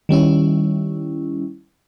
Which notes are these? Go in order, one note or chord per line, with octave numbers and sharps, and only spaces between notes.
D#3 G3 C#4 E4